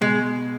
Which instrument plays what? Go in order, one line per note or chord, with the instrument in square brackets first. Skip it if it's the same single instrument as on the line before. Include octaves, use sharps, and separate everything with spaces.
[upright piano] B2 [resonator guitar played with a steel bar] G#3